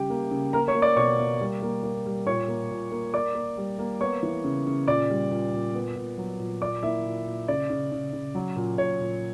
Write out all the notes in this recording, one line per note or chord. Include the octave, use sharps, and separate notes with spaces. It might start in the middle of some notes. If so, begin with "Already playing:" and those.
Already playing: C#3 G3 G4 G5
A#3
C#3
A#3 A#4 A#5
C#5 C#6
A#3
D5 D6
B2 C#5 C#6
A#3
G3
A#3
A#3
G3
A#2 C#5 C#6
A#3
A#2
A#3
A#3 D5 D6
A#3
G3
A#3
B3 C#5 C#6
E3
C#3
C#3
A#2 D5 D6
G3
A#2
A#2
B3
A#2
F#3
A#2
A#2 D5 D6
A#3 E4 E5
A#2
A#2
C#3 D5
C#3
C#3
C#3
F#3
A#2
A#2 C#5
A#2